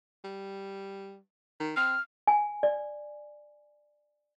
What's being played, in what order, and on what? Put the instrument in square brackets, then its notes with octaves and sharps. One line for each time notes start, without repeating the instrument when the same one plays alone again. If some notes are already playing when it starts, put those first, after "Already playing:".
[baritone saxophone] G3
D#3
[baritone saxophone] C4 [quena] F6
[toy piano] G#5
D5